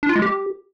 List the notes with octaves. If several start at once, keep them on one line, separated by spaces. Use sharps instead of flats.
D4
F4
G#3
G4